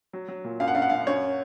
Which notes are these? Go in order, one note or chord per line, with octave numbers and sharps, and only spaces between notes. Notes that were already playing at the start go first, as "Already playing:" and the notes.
F#3
F#3
A#2
F#2 F5
F#5
F#2 F5
F#5
F#2 F5
F#2 C#5